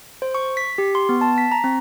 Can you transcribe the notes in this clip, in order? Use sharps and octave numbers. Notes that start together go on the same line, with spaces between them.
C5
C#6
B6
G4
C6
B3
A5
B6
A#5
C4